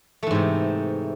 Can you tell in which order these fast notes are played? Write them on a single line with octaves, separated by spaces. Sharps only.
A3 E3 G#2 C3